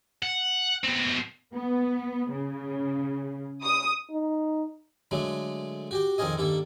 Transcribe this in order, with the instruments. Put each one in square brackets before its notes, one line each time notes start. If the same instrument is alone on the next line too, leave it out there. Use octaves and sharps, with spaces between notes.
[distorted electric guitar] F#5
B2 C4
[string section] B3
C#3
D#6
[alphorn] D#4
[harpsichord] D3 F#3 G#3 A3
F#4 G4 G5
F2 D#3 C4 F4 G#4 D#5
G2 D#3 A#3 A4